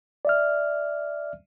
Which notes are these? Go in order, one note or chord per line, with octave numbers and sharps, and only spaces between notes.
D5 E5 F6